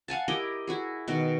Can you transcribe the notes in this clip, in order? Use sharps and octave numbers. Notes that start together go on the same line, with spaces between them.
F5 F#5 G#5 A5
E4 G4 A#4 D#5
E4 F#4 G#4
B2 D#3 F#4